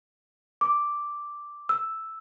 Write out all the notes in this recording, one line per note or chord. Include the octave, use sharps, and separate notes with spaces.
D6
E6